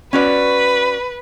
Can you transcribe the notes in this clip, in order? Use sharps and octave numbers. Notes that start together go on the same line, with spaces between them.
C#4 F#4 B4 D5